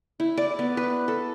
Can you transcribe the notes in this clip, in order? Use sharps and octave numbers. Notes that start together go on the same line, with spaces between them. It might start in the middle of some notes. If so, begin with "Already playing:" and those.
E4
D5
B3
B4
A4